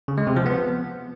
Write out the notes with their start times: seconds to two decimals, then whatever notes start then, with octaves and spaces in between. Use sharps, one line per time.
0.08 C#3
0.18 G#3
0.27 C3
0.36 F3
0.46 B3